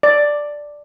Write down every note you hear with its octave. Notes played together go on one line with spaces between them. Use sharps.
D5